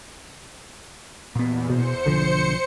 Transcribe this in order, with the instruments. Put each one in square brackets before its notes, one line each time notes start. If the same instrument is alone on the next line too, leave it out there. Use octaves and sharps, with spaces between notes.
[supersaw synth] E2 [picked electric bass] A#2 B3
[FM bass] B2 [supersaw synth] C5 C#7
[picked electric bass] B1 F3 [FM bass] D3